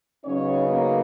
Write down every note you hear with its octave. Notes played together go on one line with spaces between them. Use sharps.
C#3 F#3 B3 C#4 D#4 C#5
A#3 A#4